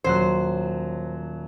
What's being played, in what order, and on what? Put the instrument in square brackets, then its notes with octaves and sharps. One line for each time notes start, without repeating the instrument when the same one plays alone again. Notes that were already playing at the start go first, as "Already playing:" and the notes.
[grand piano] D#1 F#3 F#6 [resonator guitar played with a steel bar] C5